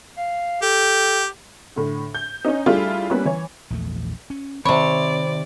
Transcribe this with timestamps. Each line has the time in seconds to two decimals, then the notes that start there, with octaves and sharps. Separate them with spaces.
0.17 F5
0.62 G4 A4
1.76 A2 D3
2.15 G6
2.45 C#4 D#4
2.66 G3 A3 D4 E4 F4 G#4
3.10 G3 A#3 B3 C#4 E4 B4
3.25 E3 C#5
3.70 A#1 E2 A3
4.30 C#4
4.65 C3 D#3 C4 C#5 D5 B5